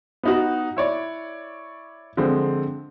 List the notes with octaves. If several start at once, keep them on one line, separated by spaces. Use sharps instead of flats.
B3 D#4 F#4
E4 C#5 D5
D3 F3 G#3 C4